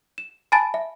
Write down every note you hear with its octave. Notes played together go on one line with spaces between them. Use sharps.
E7
G#5 A5 B5 A6 D7
E5